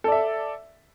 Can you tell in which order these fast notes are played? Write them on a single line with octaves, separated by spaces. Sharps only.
A4 D5 E5